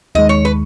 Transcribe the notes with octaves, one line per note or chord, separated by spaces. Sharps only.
D#2 D#3 G#3 D#5
C#5
B4